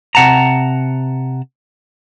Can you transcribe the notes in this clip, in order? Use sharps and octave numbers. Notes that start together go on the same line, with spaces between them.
C3 F#5 A5 A#5